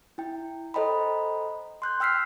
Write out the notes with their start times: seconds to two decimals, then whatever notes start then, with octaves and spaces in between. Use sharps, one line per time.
0.18 E4 G5
0.74 A4 C5 D#5 G5 A#5 B5
1.82 C6 F#6 G6
2.00 G5 E6 F6 B6 C7